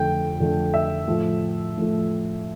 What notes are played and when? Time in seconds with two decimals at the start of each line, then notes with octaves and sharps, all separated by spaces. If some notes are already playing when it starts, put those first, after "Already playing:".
Already playing: F2 D3 A3 G5
0.40 F2 D3 A3
0.74 E5
1.07 A2 F3 A3
1.77 A2 F3 A3